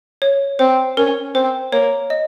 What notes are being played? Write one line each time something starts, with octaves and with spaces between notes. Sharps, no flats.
C#5
C4 C5
C#4 A#4
C4 C5
A#3 C#5
D#5